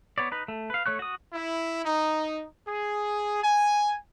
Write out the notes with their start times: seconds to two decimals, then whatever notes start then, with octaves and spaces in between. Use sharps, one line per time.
0.18 B3 C#5 D5
0.32 D#4 B4
0.48 A3
0.70 B4 F5
0.86 A3 C#5 C#6 F#6
0.99 F#4 D#6
1.33 E4
1.85 D#4
2.67 G#4
3.43 G#5